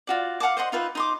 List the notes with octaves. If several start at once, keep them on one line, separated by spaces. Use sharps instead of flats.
F4 F#4 D5
F5 F#5 A5 D6
C5 D#5 F#5 C6
D#4 F4 B4 E5
D#4 C6 D6